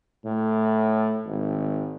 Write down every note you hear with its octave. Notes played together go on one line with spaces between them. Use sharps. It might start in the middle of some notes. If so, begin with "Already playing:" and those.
A2
G#1